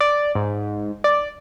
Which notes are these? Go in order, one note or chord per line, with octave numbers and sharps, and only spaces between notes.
D5
G#2
D5